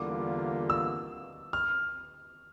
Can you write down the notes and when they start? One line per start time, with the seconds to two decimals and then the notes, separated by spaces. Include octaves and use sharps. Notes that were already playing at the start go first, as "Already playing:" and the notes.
Already playing: E2 D3 G3 A#3 F4 D6
0.70 E6
1.53 F6